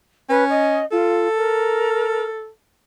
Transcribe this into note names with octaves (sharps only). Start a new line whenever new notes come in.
C#4 B4
D#5
F4 A4
A#4